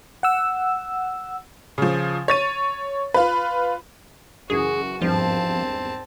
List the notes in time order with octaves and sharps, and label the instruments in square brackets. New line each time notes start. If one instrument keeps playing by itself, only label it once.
[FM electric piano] F#5 E6
[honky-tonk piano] C#3 F3
C#5 A6 D#7
F4 B4
[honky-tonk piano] F#2 C#3 E3 [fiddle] F#4 [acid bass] G#4
[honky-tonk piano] G#1 E2 G2 [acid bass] F3 [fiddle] C4 A5